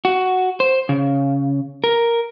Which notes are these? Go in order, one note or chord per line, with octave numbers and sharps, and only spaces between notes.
F#4
C5
C#3
A#4